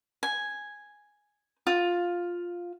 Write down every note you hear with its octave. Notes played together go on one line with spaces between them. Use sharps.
G#5
F4